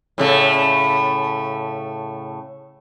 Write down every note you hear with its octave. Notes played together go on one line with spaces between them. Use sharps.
A2 C#3 A3